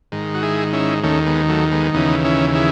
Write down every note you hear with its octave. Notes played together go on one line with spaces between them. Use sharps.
G#2 D#3
F#4
E4 G#4
C#4 E4
D#2 D#3 A3 C#4
G#3 B3
F#3 A3
G#3 B3
D#2 C#3 E3 B3 D#4
C#4 E4
E4 G#4